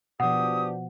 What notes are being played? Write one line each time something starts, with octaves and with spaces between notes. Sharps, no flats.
B2 F3 B3 D4 G4 F#5 D#6